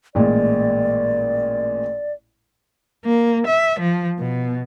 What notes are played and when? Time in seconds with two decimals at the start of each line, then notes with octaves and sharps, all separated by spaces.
0.15 A1 A#2 G#3 D5
3.05 A#3
3.47 E5
3.79 F3
4.19 B2